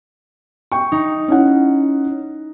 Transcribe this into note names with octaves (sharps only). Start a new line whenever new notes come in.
G5 C#6
D#4
C#4 E4 F#5